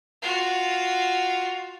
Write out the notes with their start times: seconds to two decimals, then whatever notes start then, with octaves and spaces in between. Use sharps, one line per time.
0.22 F4 F#4